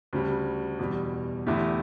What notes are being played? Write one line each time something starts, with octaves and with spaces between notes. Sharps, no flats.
D2 C#3 G3
E2 B2 G3
E2 D3 A3 E4 G4